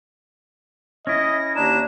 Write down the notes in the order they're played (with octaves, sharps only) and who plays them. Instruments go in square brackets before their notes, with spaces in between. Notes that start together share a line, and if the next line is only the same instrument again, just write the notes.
[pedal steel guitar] C#4 E4 [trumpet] D#5 [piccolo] A#6
[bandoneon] D#2 D4 [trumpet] A#5 [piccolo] E7